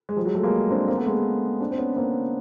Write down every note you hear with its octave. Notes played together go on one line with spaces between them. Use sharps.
G#3
F3 G3
F#3 G#3
G3 A3
G#3 A#3
C4 D4
A#3 C4
A3 B3
G#3 A#3
C4 D4
C4
B3 C#4
A#3 C4